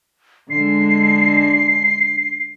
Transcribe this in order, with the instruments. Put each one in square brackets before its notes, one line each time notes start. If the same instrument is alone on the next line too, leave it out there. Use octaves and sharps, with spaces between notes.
[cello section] D3 G#3 [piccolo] C7